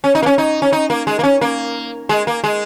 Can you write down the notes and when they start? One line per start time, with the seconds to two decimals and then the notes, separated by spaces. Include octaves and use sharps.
0.04 C#4
0.15 D#4
0.22 A#3
0.26 C#4
0.38 D#4
0.62 C#4
0.72 D#4
0.90 A#3
1.07 G#3
1.19 A#3
1.23 C#4
1.41 A#3
2.09 G#3
2.27 A#3
2.44 G#3